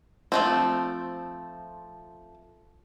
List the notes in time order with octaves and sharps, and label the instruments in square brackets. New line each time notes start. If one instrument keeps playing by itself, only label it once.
[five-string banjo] F3 A3 C4